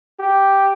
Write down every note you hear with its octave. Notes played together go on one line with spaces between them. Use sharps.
G4